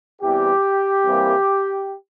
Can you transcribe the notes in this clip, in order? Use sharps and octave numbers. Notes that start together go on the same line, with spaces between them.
E2 E3 G3 C4 G4
C2 C3 E3 G3 A#3